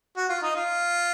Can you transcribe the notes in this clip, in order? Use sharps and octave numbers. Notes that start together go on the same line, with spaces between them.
F#4
F4
D#4
F4